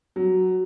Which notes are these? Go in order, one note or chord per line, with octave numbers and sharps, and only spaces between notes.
F#3